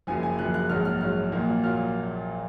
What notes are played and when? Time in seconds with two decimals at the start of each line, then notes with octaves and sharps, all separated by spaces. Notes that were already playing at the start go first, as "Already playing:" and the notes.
0.07 F#1 F#2 F3 G#5
0.23 G#5
0.38 F#1 F#2 F3 F#6
0.54 F#6
0.69 A#1 G#2 F#3 F6
0.85 F6
1.01 A#1 G#2 F#3 F6
1.32 A#1 A#2 F#3 A#3
1.63 A#2 F#3 A#3 F6